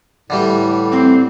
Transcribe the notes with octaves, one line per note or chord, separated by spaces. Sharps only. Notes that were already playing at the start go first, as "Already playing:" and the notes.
A2 D3 E3 G3
C4